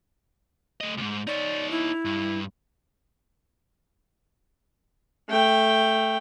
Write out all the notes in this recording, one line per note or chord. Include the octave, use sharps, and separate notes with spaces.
A3 D#5
D2 G#2
D#4 C#5 D5
E4
G2
A3 G5